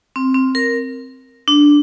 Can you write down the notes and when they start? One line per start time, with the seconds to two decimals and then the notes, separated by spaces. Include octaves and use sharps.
0.16 C4
0.34 C4
0.55 A#4
1.48 D4